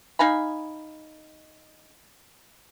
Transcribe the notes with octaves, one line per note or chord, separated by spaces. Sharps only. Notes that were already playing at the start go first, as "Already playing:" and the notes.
D#4 F5 G#5 B5